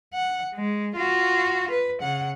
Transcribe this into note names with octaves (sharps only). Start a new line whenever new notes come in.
F#5
G#3
F4 F#4
B4
C#3 F#5